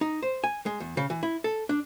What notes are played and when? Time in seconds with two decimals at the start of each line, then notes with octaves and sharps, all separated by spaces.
0.01 D#4
0.22 C5
0.44 G#5
0.66 G#3
0.80 E2
0.97 C#3
1.10 E3
1.23 E4
1.44 A4
1.69 D4